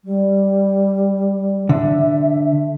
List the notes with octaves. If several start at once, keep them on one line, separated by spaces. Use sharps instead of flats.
G3
D3 E5